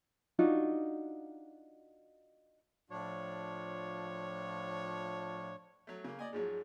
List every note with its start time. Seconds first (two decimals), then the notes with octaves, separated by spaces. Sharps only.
0.39 D4 D#4 F4 F#4
2.90 A2 F3 D4 F4 C#5
5.87 F#3 A3
6.04 C#3 A#3
6.19 A#3 D5 D#5 G#5
6.33 G#2 F3 F#3 G#4